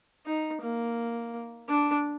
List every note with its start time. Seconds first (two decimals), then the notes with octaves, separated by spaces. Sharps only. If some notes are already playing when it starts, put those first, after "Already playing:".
0.26 D#4
0.62 A#3
1.68 D4